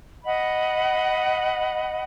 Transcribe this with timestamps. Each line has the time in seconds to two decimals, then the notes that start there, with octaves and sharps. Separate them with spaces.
0.25 D#5 F#5 B5